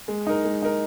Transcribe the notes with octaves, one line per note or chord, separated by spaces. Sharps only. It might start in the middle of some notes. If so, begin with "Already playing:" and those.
G#3
D#4 A#4
G#3
D#4 A#4